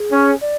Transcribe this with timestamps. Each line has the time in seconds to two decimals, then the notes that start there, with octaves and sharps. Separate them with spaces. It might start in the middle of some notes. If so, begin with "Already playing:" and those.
Already playing: G#4
0.13 C#4
0.41 D5